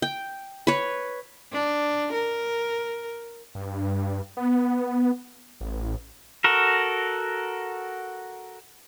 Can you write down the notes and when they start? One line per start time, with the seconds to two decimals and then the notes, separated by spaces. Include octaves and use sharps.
0.02 G5
0.67 B4 C#5
1.53 D4
2.13 A#4
3.55 G2
4.37 B3
5.61 A1
6.44 F#4 A4 A#4